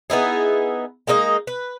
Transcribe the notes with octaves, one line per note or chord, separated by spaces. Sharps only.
B3 D#4 E4 G#4
G#3 A#3 D#4 D#5
B4